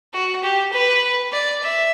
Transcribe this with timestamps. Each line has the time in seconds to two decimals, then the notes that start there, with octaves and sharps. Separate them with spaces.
0.14 F#4
0.43 G4
0.73 B4
1.32 D5
1.63 E5